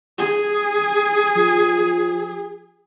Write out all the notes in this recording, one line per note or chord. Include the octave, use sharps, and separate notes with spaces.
G#4
F3